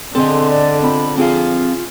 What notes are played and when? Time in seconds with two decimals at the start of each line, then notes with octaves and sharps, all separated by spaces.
0.15 D3 C4 G#4 A4 D#5 C6
0.50 D5
0.83 C4 F4 B5
1.18 C4 F4 G#4 F5